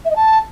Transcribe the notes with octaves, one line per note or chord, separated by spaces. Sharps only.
E5
D#5
A5